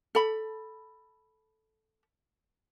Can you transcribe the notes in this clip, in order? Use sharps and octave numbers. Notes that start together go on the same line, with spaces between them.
A4 B5